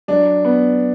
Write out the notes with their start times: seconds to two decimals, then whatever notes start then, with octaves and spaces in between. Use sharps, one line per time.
0.08 F#3 D4
0.45 B3